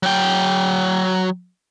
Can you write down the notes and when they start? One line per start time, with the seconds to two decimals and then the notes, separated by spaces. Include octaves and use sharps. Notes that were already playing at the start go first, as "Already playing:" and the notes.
0.03 F#3 G5